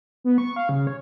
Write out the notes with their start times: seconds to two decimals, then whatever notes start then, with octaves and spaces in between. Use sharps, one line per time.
0.24 B3
0.38 C#6
0.56 F5
0.69 C#3
0.87 C#5